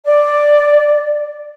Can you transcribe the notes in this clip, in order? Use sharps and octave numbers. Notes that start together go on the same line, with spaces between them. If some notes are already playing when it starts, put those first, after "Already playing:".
D5